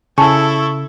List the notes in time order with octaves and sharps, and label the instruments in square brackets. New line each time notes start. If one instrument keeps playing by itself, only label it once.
[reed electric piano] C#3 [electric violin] E4 A4 [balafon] G#5 A5 [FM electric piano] C#6